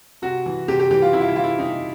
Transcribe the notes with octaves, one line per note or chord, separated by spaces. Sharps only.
C3 F#4
E3
C3 G4
G4
E3 G4
F4
C3 E4
F4
E4
E3 F4
E4
C3 D#4